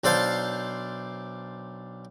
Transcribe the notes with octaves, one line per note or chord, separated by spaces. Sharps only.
B1 D4 A4 C5 F5 A5